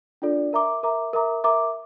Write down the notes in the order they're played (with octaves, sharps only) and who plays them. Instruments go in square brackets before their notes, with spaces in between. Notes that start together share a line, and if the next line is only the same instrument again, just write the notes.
[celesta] D4 F4 A4 D5
A#4 E5 A#5 D6
A#4 E5 A#5 D6
A#4 E5 A#5 D6
A#4 E5 A#5 D6